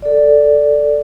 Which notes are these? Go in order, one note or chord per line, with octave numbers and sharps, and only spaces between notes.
A4 D5